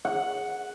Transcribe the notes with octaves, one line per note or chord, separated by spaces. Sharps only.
F#5